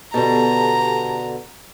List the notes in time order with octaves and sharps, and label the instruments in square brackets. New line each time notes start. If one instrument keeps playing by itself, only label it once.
[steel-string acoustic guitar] B2 D3 [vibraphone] G4 A4 A5 [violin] A#5